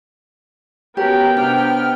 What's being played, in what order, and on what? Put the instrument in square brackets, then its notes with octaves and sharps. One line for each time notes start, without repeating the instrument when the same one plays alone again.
[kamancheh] B3 G5 [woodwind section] C#4 F#4 A#4 [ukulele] G4
[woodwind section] C3 F6 [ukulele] D4